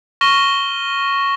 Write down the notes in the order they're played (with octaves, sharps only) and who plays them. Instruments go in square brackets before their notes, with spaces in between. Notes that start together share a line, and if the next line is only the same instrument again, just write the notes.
[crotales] C#6 F6 A#6 D#7 E7 G7